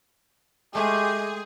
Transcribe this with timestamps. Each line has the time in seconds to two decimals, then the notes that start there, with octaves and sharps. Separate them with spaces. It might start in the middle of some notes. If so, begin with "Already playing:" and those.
0.75 G#3 A3 G4 G#4